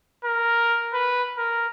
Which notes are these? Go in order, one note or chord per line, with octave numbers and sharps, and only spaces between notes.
A#4
B4
A#4